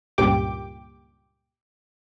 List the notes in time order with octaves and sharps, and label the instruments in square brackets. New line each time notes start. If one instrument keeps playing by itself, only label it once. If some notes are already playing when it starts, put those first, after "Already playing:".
[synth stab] C#2 G2 A#2 G4 G5 D6